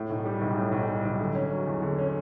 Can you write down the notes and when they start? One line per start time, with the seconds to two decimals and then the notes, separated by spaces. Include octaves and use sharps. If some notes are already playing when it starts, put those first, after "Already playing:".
Already playing: A2
0.10 B1
0.25 G3
0.41 B1
0.57 A2
0.72 B1
0.88 G3
1.04 B1
1.20 D3
1.35 C#4
1.51 F#3
1.67 E2
1.82 D3
1.98 C#4